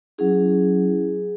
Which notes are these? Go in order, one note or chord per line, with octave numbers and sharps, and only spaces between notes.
F#3 C#4 E4 G#4